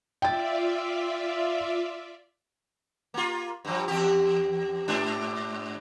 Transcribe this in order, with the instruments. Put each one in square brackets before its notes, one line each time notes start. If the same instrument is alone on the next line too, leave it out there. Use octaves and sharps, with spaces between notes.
[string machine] F4 D5 E5 [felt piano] G5 A6
[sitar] A#3 F4
G2 F3
E2 G4
G#2 D4